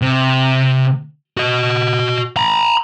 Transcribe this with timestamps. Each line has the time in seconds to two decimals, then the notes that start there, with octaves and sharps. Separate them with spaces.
0.02 C3
1.37 F#4 D#5
2.37 A#5 B5